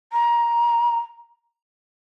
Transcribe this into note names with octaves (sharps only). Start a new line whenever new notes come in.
A#5